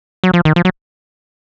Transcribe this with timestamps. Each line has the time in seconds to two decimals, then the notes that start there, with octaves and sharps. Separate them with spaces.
0.24 F#3
0.34 F3
0.45 D#3
0.56 F3
0.65 F#3